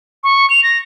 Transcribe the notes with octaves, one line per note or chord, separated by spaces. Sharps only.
C#6
F7
A#6